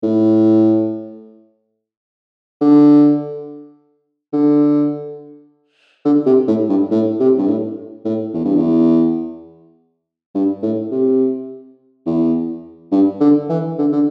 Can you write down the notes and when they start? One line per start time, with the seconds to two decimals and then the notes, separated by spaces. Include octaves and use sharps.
0.03 A2
2.61 D3
4.33 D3
6.05 D3
6.26 C3
6.48 A2
6.69 G2
6.91 A2
7.20 C3
7.38 G2
7.48 A2
8.05 A2
8.34 E2
8.45 G2
8.56 E2
10.35 G2
10.63 A2
10.91 C3
12.06 E2
12.92 G2
13.21 D3
13.50 E3
13.79 D3
13.92 D3